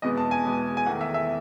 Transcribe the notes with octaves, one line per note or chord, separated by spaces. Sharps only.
E2 B2 G#3 B3 D#5
A5
G#5
E2 B2 G#3 B3
G#5
E2 D#3 A3 F#5
E5
E5